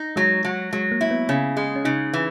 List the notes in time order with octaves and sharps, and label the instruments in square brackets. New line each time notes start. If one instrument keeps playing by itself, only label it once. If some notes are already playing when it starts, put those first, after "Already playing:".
Already playing: [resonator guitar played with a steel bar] D#4
[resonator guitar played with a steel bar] F#3 [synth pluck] G#3
[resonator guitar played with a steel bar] F#3
[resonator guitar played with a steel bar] F#3 [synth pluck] G#3
[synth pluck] A#3
[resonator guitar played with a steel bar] E4
[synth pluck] B3
[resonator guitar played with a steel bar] C#3 [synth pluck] C#4
[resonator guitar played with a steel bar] G#3
[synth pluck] C#4
[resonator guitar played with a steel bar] C#3 [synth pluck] D#4
[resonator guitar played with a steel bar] E3